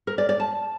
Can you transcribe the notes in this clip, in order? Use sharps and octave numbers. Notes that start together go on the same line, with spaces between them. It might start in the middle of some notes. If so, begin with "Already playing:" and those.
A#4
D5
D5
A5